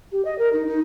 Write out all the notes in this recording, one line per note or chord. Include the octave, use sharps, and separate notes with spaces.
G4
D#5
A#4
D#4
D#4